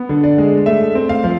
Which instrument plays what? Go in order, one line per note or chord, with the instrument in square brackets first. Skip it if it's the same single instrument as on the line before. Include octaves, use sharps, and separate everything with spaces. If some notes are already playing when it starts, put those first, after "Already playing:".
Already playing: [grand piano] B3
D3
D5
G#3
A3 E5
C4
F5
F3